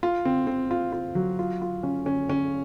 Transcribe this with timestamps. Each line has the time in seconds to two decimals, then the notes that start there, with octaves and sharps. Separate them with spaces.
0.03 F4
0.25 C4
0.47 C4
0.71 F4
0.93 F4
1.15 F#3
1.39 F4
1.62 F4
1.83 C#4
2.06 C#4
2.29 C#4